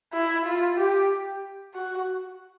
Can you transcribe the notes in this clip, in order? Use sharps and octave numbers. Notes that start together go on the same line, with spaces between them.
E4
F4
G4
F#4